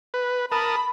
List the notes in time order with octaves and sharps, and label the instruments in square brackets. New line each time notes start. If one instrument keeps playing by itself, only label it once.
[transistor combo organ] B4
[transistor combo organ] A#4 A5 D#6 [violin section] B5